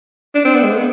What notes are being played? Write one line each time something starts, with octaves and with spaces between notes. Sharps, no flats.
D4
C4
B3
G#3
A3
B3